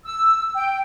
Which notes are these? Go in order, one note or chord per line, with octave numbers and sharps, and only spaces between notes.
E6
G5